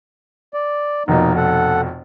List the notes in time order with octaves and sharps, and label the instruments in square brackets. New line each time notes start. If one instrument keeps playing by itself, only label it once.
[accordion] D5
[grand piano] F1 F2 B2 [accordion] A#3 D#4
[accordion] A4 F#5